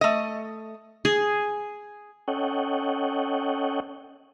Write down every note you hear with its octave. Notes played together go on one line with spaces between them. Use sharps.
A3 D#5
G#4
C#4 A4 C#5 D#5 F#5 G5